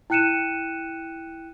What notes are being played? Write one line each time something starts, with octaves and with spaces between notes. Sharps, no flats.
E4 G5 F#6 C#7 D#7 E7